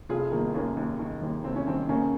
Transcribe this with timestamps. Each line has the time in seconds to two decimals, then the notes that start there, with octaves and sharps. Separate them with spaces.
0.09 F1 F4 G#4
0.32 D#3 A#3
0.54 D#2 A#3 C#4
0.77 D#2
0.99 D#3
1.22 D#2
1.44 F1 C4
1.56 C#4
1.67 D#3 C4
1.89 C#3 A#3 C#4